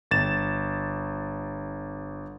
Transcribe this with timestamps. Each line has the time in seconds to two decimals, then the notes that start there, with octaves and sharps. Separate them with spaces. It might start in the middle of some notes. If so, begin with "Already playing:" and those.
0.11 G1 A6 E7